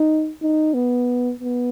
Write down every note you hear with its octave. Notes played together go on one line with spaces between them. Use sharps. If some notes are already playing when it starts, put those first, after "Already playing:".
Already playing: D#4
D#4
B3
B3